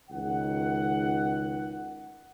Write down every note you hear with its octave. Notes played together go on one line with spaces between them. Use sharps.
C#2 D#3 F#5